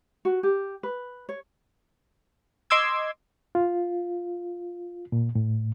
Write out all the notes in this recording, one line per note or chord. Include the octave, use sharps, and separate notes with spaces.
F#4
G4
B4
C#5
D#5 C6 D6 E6 G#6
F4
A#2
A2